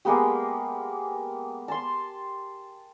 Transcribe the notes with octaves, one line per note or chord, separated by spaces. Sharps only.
G#3 A#3 B3 G4
A5 C6